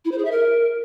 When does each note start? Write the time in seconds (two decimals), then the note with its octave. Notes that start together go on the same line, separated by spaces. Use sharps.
0.05 E4
0.12 C5
0.18 G#4
0.25 E5
0.31 A#4